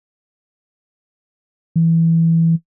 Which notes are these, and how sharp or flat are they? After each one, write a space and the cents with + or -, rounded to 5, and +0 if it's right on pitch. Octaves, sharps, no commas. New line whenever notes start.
E3 +0